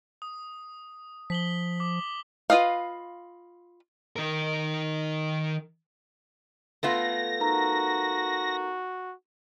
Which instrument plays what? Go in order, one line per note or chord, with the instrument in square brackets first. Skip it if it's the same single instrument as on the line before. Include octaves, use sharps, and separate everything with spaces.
[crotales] D#6
[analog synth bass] F3 [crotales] B6 F#7 G7
[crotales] D6
[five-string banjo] F4 B4 D#5 F5
[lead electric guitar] D#3 A#4
[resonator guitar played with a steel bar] A3 B3 F4 [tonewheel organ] A#6
[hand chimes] D#4 A#4 A#5 [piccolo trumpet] F#4